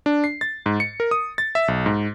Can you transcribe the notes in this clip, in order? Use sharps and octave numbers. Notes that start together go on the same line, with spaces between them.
D4
C7
A6
G#2
C#7
A#4
D#6
A6
E5
B1
G#2